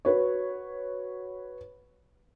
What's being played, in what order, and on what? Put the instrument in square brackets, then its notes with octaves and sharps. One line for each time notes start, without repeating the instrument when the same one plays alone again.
[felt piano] F#4 B4 C#5